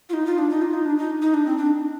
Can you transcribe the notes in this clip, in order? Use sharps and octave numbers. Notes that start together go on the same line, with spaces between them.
F4
D#4
F4
D4
D#4
F4
D#4
D4
D#4
D#4
D4
C4
D4